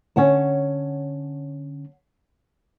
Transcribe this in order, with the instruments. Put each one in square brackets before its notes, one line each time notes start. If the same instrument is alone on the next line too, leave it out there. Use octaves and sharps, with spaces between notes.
[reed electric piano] D3 C#4 [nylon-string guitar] C#5 F#5 A5